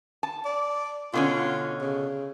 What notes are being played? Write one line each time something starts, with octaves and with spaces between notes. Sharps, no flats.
A5
D5
B2 D3 C#4 F4
C#3